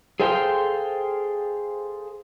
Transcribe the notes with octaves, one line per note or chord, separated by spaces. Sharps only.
G#4 A4 C5 F5 G5